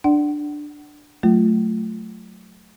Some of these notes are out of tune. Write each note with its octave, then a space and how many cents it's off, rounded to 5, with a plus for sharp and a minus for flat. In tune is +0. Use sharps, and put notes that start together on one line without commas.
D4 +10 D5 +0 F#5 +30
F#3 +0 A3 +0 F4 +0